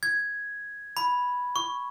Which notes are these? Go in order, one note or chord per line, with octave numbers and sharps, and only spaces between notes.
G#6
B5
C#6